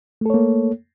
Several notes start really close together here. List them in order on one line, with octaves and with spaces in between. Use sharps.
A3 A4 C#5 A#3